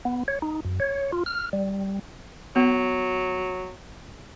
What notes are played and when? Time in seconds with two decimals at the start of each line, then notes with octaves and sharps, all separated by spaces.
0.05 B3
0.28 C#5
0.42 D#4
0.65 F#2
0.80 C#5
1.12 F4
1.26 F6
1.53 G3
2.56 F#3 B3